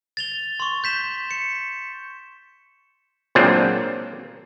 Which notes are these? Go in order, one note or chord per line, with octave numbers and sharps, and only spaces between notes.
A6 F7 G7
C6 C#6
G6 B6 E7
C#7
A#2 F#3 G#3 A#3 C4 D4